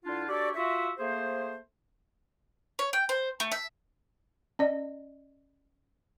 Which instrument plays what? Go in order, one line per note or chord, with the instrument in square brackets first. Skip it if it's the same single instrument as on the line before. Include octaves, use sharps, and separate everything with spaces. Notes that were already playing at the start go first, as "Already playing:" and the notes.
[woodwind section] D3 D4 E4 F4
D4 F#4 G4 A4 C#5 D5
F4 F#4 E5
A3 A#3 G#4 C5
[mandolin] C#5
G5
C5
A3
E5
[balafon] C#4 D5 D#5